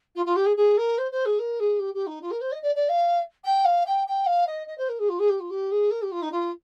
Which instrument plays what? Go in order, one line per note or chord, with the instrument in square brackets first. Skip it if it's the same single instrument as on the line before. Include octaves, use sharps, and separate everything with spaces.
[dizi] F4
F4
G4
G#4
G#4
A#4
C5
C5
G#4
A#4
G#4
G4
G4
D#4
F4
A#4
C5
D#5
D5
D5
F5
G5
F5
G5
G5
F5
D#5
D#5
C5
A#4
G#4
F4
G#4
G4
F4
G4
G#4
A#4
G4
F4
D#4
F4